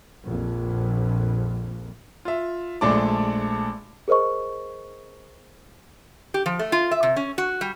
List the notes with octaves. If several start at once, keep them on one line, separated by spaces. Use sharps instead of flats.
A#1 F2
F4 E5
A#1 G#3 A3 D4 A5 D6
G#4 A#4 C5 D#5 C#6
G4
F3
A3
F4
E5
C3
C#4
F#4
G3